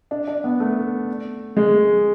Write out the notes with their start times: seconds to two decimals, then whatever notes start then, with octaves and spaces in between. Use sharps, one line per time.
0.11 D4
0.28 D4
0.44 B3
0.60 A3
1.57 G#3